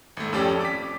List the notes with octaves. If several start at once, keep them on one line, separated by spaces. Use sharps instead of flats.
G#1 A3
F2 C#4 G4 A4 D5 E6
D6 B6